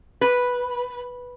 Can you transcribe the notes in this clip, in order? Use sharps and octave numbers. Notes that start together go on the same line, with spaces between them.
B4